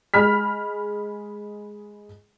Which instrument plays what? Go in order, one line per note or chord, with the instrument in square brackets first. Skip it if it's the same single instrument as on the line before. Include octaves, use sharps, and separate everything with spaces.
[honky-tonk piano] G#3 B5 F6 B6